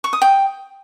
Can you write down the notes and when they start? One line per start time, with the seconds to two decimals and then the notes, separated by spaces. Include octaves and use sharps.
0.04 C#6
0.13 D#6
0.22 G5